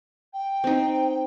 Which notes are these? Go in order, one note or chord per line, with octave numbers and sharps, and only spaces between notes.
G5
C4 D#4